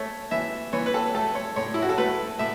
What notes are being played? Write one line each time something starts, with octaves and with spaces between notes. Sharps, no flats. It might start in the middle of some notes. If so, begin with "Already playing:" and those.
Already playing: A3 C#5
E3 E5
E3 C#5
B4
A4
A3 A4
C#5
A2 C#5
E4
F#4
A4
A3 B4
A2 E5